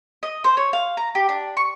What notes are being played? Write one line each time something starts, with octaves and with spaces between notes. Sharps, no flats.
D#5
C5
C#5
F5
A#5
G4
D4
C#6